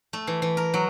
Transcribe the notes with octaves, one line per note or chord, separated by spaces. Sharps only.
A3
E3
E3
A#4
F#3